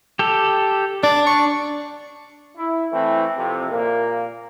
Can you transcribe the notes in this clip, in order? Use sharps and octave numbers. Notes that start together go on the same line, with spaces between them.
G4 A4
D4 D5
C#6
E4
E3 A3 C4
F2 C3
A#2 A#3